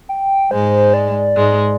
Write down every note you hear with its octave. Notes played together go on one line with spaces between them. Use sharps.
G5
G#2 G#3 C5
D5
G#2 G#3